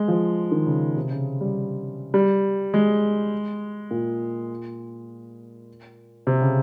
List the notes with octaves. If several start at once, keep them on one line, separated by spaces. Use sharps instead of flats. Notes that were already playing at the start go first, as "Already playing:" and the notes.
Already playing: G#3
F3
D#3
C#3
C3
C#3
G3
G3
G#3
A#2
C3
C#3